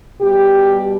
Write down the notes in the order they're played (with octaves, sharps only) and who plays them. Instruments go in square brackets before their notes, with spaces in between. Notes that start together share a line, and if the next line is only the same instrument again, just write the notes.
[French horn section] B2 G3 G4